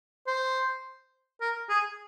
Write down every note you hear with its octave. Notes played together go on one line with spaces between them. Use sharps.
C5
A#4
G#4